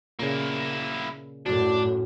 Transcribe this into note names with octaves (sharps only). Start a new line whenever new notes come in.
A#2 C#3 A#3 E4
F#2 A2 D4 F#4